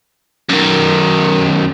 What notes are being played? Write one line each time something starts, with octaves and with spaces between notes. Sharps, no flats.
F#2 D#3